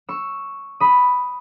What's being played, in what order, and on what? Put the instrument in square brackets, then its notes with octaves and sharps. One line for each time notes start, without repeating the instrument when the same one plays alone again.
[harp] C#6 E6
B5 D#6